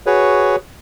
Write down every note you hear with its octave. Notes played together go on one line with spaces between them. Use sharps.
F#4 G#4 B4 C#5